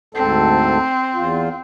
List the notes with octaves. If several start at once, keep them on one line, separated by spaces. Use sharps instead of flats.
D2 G#2 C4 A4
E2 F4